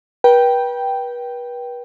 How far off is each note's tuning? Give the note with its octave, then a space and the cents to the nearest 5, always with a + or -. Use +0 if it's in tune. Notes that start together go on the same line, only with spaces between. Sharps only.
B4 -35 G5 -5